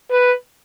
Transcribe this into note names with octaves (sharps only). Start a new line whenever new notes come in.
B4